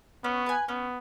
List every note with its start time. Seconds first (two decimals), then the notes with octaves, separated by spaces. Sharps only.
0.24 B3 C#4
0.46 B4 G#5
0.69 B3 C#4